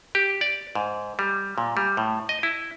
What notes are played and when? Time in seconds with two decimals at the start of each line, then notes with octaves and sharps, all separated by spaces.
0.15 G4
0.41 D5
0.75 G#2
1.19 G3
1.58 A#2
1.77 G3
1.97 A2
2.29 D#5
2.43 E4